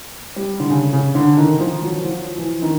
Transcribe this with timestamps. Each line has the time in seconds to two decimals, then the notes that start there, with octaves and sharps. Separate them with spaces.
0.36 G3
0.60 D3
0.70 C#3
0.93 C#3
1.15 D3
1.37 D#3
1.59 F3
1.82 F#3
2.04 F3
2.38 E3
2.62 D#3